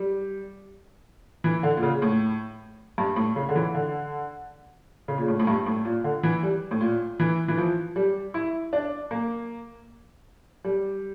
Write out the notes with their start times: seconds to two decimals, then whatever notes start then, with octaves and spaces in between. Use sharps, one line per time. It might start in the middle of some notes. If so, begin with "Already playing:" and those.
Already playing: G3
1.44 E3
1.63 D3
1.77 A#2
1.83 C#3
2.02 A2
2.98 G2
3.16 A2
3.36 C#3
3.49 D3
3.56 E3
3.75 D3
5.08 C#3
5.18 A#2
5.28 A2
5.40 A2
5.47 G2
5.66 A2
5.85 A#2
6.04 D3
6.23 E3
6.43 G3
6.71 A2
6.81 A#2
7.20 E3
7.48 E3
7.58 F3
7.96 G3
8.34 E4
8.73 D4
9.11 A#3
10.64 G3